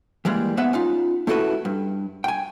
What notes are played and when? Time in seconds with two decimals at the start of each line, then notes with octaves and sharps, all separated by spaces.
0.25 E3 G3 G#3 A#3
0.57 G#2 B3 B4 E5 F#5
0.73 C#4 D#4 F4
1.27 A3 C#4 E4 F#4 A4 B4
1.65 G2
2.24 G5 G#5